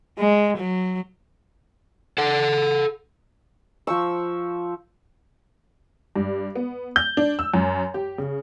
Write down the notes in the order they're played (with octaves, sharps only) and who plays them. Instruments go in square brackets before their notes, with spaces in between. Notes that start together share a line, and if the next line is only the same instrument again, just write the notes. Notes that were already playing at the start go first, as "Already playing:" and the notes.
[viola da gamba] G#3
F#3
[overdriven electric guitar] A4 F#5
[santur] F3 C5 C#6 E6
[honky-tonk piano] G2
B3
G6
D4
E6
F#2
G4
C#3